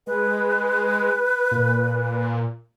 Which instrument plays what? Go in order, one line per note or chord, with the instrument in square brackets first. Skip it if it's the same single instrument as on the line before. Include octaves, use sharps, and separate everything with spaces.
[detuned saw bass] G#3 [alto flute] B4
[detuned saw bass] A#2